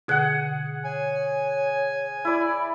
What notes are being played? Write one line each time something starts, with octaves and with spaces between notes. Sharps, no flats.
B2 D3 G#4 F#5 F#6
C#5 G#5
E4 D5 B5